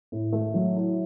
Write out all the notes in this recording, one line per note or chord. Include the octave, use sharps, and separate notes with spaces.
A2
A3
F#3
E4